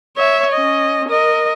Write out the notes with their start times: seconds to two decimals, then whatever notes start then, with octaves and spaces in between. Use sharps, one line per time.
0.16 C#5 E5
0.53 C#4 D#5
1.08 A#4 D#5